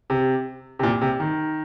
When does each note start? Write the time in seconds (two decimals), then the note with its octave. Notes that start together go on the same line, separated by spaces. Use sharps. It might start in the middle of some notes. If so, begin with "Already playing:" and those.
0.10 C3
0.79 C3
0.83 A#2
1.01 C3
1.20 D#3